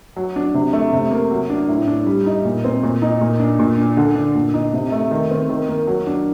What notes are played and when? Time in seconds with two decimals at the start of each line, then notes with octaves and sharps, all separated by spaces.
0.16 F#3
0.36 D4
0.54 C3
0.73 A3
0.93 C3
1.11 A#3
1.31 F#3
1.50 D4
1.68 A2
1.88 D4
2.07 G3
2.26 D#4
2.45 A#2
2.64 C4
2.83 A#2
3.02 D#4
3.21 A#2
3.40 D4
3.59 A#2
3.78 D4
3.97 D3
4.16 D4
4.35 A#2
4.54 D#4
4.74 C3
4.92 A3
5.11 D#3
5.31 C4
5.49 D#3
5.69 A#3
5.87 F#3
6.07 D4